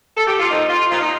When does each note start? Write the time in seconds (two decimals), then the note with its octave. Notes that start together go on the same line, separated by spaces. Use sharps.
0.17 A4
0.28 G4
0.39 F4
0.51 A#2 F3 D#4
0.70 F4
0.90 A#2 F3 F4
1.00 D#4